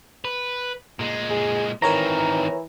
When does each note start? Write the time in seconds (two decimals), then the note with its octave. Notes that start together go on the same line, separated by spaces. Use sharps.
0.25 B4
0.99 A#2 G#3
1.30 G#4
1.82 D#3 E3 C4 A#4 C#5 A#5